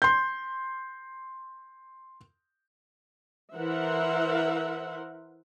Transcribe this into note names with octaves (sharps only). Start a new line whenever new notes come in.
C6 G6
E3 A#4 C5 E5 F#5